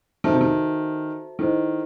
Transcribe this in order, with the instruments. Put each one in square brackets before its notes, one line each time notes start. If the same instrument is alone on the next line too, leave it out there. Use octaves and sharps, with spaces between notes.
[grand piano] D#3 [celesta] F#4 A4 C5 E5 A5
[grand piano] C3
D#3
[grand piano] D#3 [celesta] E4 A4 C5 D#5